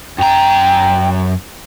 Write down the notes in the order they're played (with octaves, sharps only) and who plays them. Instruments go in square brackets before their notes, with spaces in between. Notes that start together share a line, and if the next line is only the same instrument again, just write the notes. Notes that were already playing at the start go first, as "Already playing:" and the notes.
[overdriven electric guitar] F#2 A#5 [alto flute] G5